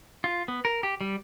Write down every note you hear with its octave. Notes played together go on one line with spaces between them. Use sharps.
F4
B3
A#4
G4
G3